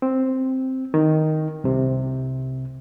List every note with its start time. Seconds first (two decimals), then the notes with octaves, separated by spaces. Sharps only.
0.02 C4
0.94 D#3
1.64 C2 C3